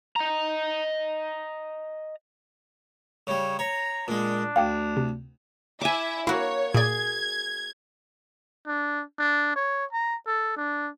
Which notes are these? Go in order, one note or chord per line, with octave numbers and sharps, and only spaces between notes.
D#5 A#5
C#3 G3 C#5
C#5 A#5
A#2 G#3 D4
D2 F5 G5 D6
C3
E4 E5 G#5 D6
A#3 E4 F#4 C#5
A#2 G#4 D5 G#6
D4
D4
C#5
A#5
A4
D4